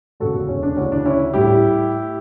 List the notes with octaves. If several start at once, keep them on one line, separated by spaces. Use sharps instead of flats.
E1 D2 C#3 F#4 A4
C#4
D4
D2 C#3 E3 C#4
D4
C#4 E4
A2 G3 E4 G4